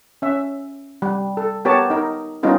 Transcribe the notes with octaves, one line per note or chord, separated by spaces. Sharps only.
C#4 E5
G3
A4
B3 G4 A#4 C#5 A5
D#4 A#4
G3 B3 C#4 D#4 F4 A#4